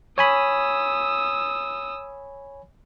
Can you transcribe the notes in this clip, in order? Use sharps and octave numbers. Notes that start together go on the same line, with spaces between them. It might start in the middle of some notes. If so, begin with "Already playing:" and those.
C#5 G#5 B5 D#6 E6